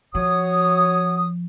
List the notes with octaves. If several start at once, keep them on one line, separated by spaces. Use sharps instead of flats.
F3 F#4 C#5 D#6